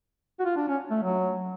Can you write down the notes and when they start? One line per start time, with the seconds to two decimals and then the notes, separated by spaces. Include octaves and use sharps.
0.40 F#4
0.45 F4
0.56 D4
0.68 C#4
0.91 A3
1.03 F#3